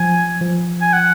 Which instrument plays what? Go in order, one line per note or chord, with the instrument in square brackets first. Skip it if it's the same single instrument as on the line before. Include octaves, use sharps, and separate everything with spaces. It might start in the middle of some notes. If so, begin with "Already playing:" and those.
Already playing: [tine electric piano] F3 [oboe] G#5
[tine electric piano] F3
[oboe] G#5
F#5